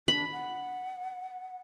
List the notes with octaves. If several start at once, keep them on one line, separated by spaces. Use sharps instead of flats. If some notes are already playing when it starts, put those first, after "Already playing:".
D4 B5
F#5